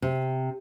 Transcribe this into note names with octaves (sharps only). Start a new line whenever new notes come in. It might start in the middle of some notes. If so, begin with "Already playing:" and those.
C3